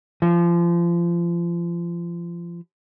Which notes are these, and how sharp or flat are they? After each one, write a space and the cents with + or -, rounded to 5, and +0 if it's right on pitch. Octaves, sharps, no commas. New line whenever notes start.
F3 -30